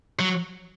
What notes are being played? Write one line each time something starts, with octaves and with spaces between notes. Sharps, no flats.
F#3